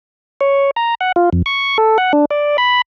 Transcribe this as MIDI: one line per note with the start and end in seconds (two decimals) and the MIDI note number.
0.41 0.71 73
0.76 0.95 82
1.01 1.12 78
1.16 1.30 65
1.33 1.42 41
1.46 1.78 85
1.78 1.98 69
1.98 2.12 78
2.13 2.25 62
2.31 2.57 74
2.58 2.82 83